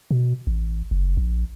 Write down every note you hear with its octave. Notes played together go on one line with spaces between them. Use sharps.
B2
A1
F#1
A#1